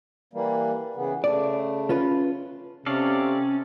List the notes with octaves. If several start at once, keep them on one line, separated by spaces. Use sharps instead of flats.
E3 G3 A#3
C#3 E3 B3
C#3 A3 D5
C#4 F4 B4
C3 C#4 A4 D5 F5